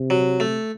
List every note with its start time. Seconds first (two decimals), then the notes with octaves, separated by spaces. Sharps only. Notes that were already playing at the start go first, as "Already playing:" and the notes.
Already playing: C3
0.10 F#3
0.40 A3